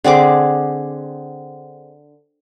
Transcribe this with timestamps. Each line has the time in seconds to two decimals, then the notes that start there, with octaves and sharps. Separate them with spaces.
0.04 D3 C4 G#4 D6